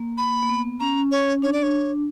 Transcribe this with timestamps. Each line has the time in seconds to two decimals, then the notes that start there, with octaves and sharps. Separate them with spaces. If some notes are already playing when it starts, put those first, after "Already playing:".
Already playing: A#3
0.18 B5
0.43 A#3
0.49 B3
0.80 C#4 A#5
1.12 C#5
1.42 D4 C#5
1.53 D5
1.63 C#5